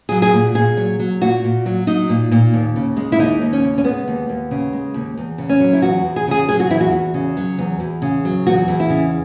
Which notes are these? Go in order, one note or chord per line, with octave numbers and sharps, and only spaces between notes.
F#3 G#4
G#4
A#2
A#2 G#4
F#3
F#3
A#2 F#4
A#2
F#3
F#3 D#4
A#2
A#2
D#2
C#3
G#3
E4
D#2 D#4
D#2
C#4
C#3
C#4
G#3 B3
D#2
D#2
C#3
G#3
D#2
E2
C#3
C#4
F#3
E4
E2 F#4
E2
G#4
C#3 G#4
F#3 G#4
F#4
E2 E4
F#4
E2
C#3
F#3
E2
E2
C#3
F#3
E2 F#4
E2
E4
C#3